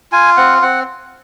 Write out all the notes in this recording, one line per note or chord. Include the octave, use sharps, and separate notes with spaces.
F4 G#5
C4 F#5
C4 F#5